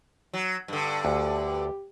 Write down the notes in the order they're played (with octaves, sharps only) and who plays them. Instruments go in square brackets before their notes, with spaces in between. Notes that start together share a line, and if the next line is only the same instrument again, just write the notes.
[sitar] F#3
G2 D3
[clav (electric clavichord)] D2 [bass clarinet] G4